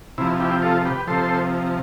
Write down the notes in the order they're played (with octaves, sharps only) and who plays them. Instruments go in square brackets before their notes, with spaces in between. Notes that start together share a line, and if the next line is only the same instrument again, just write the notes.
[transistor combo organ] C3 F3 E4
E4 G4
F4 A4
G4 B4
C3 F3 A4 C5